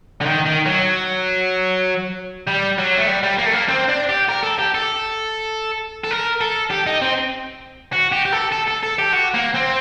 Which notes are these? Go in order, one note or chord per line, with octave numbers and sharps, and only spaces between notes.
D3
D#3
D#3
F#3
G3
F#3
A3
G3
G3
A#3
A3
A#3
C4
D4
G4
A#4
A4
G4
A4
A4
A#4
A4
G4
D#4
C4
F#4
G4
G4
A4
A4
A4
A4
G4
F#4
A#3
C4